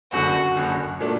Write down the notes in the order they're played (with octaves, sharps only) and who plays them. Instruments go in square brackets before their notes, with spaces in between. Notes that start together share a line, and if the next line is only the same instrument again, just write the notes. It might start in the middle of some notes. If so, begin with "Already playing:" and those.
[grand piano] F#1 F#2 D3 [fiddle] F#4
[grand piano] F#1 F#2 D3
A#2 F#3 A3 D4